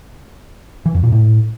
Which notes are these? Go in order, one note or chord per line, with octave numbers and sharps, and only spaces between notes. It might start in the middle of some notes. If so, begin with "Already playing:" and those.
E3
F2
A#2
A2